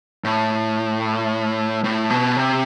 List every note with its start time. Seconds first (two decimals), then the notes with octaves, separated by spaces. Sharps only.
0.24 A2
1.84 A2
2.10 B2
2.37 C3